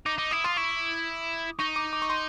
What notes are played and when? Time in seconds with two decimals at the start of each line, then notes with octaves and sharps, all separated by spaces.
0.06 D#4 D6
0.18 D#4 D6
0.31 E4 D#6
0.44 F4 C6
0.57 E4 C#6
1.59 D#4 C#6
1.76 D6
1.93 D6
2.02 C#6
2.10 C6